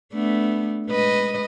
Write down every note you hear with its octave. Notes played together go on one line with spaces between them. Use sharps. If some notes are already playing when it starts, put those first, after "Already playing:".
A3 B3 D4
G#3 B4 D#5